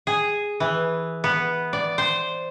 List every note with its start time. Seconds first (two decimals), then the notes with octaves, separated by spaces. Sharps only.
0.07 G#4
0.60 E3
1.24 B3
1.73 D5
1.98 C5